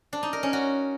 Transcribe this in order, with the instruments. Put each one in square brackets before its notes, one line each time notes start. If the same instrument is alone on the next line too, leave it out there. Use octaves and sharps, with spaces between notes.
[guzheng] D4
D#4
A#4
C#4
F#4